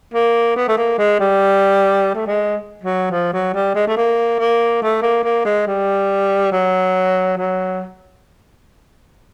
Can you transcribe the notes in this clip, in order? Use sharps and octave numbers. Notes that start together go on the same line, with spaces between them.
A#3
B3
A3
A#3
G#3
G3
A3
G#3
F#3
F3
F#3
G3
G#3
A3
A#3
A#3
A3
A#3
A#3
G#3
G3
F#3
F#3